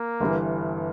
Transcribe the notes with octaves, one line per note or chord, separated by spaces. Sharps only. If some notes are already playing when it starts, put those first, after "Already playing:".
Already playing: A#3
G1 G2 E3